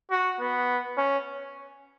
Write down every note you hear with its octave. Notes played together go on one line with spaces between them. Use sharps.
F#4
B3
C#4